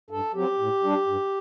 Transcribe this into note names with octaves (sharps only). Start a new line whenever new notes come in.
G2 A4
F#3 C4 G4
A2
G3 D4
G2